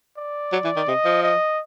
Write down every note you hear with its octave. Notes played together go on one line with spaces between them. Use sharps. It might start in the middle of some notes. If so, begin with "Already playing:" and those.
D5
F#3
E3
D#3
C3 D#5
F3
D#5